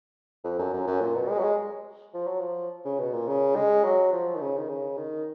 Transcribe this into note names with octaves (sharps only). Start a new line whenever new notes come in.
F2
F#2
F#2
F#2
A#2
B2
G#3
F#3
G#3
F3
F#3
F3
C#3
B2
A#2
C#3
G#3
F#3
F3
D#3
C#3
D#3
C#3
D#3